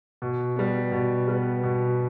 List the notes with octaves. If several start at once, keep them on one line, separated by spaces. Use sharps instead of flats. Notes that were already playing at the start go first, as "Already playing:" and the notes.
B2
G3 B3
B2
G3 B3
B2